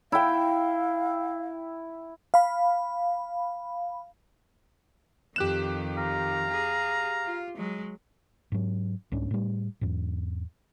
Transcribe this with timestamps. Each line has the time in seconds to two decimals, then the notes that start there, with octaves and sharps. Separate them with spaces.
0.12 E4 F5 G5
2.34 F5 B5
5.36 F2 D#3 G4 F#6 E7
5.98 F5 A#5
6.50 G#4
7.26 F4
7.56 F#3 G#3
8.52 G#2 F#3
9.12 C2 G#2 C#4 D4
9.31 A2 G3
9.81 E2 G#2